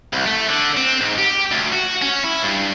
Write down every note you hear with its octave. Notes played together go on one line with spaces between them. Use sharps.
C2
A3
D3
C4
G#2
G4
D2
F#4
C#4
E4
G2